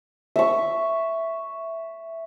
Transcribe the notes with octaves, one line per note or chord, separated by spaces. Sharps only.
E5 C#6